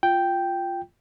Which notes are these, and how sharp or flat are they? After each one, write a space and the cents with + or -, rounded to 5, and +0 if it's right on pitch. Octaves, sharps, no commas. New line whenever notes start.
F4 +0 G5 +0